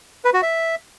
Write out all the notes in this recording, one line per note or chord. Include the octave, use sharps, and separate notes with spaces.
B4
F#4
E5